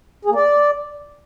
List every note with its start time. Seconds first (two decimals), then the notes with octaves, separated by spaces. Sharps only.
0.25 G#4
0.30 A#3
0.35 D5